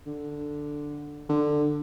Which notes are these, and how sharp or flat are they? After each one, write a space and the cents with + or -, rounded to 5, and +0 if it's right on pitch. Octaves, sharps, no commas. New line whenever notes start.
D3 +0
D3 +15